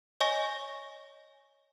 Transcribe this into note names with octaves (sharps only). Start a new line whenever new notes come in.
C#5 D#5 G#5 C#6 A#6